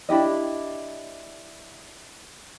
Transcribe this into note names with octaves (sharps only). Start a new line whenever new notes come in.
D4 E4 G4 D#5